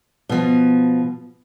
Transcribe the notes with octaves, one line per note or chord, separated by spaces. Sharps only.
B2 F3